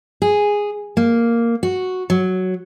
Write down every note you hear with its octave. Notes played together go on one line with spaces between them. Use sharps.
G#4
A#3
F#4
F#3